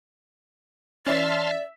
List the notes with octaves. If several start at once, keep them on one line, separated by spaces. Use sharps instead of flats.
E3 C#4 D5 E5 A5 C6 F6